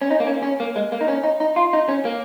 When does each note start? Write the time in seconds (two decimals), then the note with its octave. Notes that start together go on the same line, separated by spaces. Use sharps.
0.02 C#4
0.10 D#4
0.20 A#3
0.27 C#4
0.43 C#4
0.60 A#3
0.76 G#3
0.92 A#3
1.01 D#4
1.08 C#4
1.24 D#4
1.40 D#4
1.56 F4
1.73 D#4
1.89 C#4
2.05 A#3